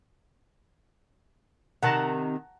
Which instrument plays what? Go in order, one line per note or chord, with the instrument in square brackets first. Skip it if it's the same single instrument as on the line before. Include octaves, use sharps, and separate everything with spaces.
[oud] C3 D#3 [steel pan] F#5 A5 A#5